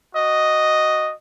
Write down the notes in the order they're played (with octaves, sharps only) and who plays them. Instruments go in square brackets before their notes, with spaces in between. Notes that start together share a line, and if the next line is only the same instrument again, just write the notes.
[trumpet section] F#4 D#5